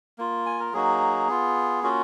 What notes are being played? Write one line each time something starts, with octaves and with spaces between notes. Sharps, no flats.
A#3 F4
G#5
A#4
F#3 A#3 D#4 F#4 G#4
B3 F4
A#3 C#4 F4 F#4